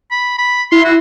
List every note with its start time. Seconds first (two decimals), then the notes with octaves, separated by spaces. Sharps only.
0.11 B5
0.39 B5
0.72 E4 C6
0.85 F#4